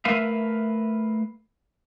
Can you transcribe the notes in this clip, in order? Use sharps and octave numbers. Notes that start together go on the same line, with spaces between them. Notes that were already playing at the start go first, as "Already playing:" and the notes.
A3 A#4 B4 E5 F5